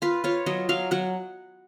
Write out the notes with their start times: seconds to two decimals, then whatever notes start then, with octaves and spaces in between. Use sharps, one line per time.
0.02 F4 B4
0.24 F4 C#5
0.46 F#3 D#5
0.69 F#3 F5
0.91 F#3 F#5